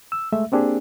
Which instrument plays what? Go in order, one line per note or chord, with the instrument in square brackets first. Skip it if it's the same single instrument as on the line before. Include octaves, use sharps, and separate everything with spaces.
[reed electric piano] E6
G#3 A3 E5
A#3 C4 D4 G4 G#4